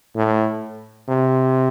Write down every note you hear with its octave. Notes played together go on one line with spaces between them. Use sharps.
A2
C3